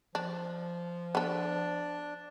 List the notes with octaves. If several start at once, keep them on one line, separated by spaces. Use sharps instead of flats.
F3 D4
B3 D4 A4